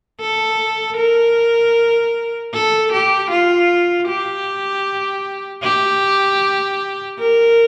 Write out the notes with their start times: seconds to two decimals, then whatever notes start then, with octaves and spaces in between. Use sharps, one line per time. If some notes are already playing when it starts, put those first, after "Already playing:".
0.21 A4
0.97 A#4
2.54 A4
2.93 G4
3.30 F4
4.08 G4
5.64 G4
7.19 A#4